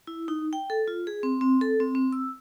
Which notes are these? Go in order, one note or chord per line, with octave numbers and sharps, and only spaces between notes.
E4
D#4
G5
A4
F4
G#4
C4
C4
A4
C4
C4
E6